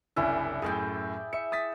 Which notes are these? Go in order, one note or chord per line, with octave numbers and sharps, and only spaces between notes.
F#1 C2 C#4 D4 E4
F#2 A2 G#4 D5 G5
E5 C#7
D#6 A6 B6